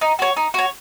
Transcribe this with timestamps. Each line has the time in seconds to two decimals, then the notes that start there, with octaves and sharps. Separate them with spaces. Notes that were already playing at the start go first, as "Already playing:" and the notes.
0.01 D#4
0.19 F#4 C#5
0.37 D#4
0.54 F#4 C#5